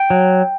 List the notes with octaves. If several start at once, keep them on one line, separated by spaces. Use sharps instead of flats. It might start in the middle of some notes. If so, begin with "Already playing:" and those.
Already playing: G5
F#3